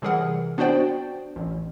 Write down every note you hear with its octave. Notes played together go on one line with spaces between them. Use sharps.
C3 E3 G3 G#4 A#4 F#5
B3 D4 F#4 C5 D5 G5
A1